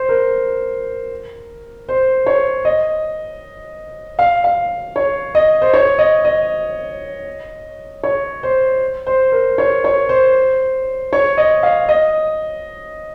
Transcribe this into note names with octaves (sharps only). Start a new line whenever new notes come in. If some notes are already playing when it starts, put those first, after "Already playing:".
Already playing: C5
A#4
C5
C#5
D#5
F5
F5
C#5
D#5
C5
C#5
D#5
D#5
C#5
C5
C5
A#4
C#5
C#5
C5
C#5
D#5
F5
D#5